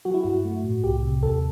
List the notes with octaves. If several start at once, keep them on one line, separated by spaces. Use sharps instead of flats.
F#3 F#4
E4
G2 F#4
A3
A2
C2 G4
C3
D#2 A4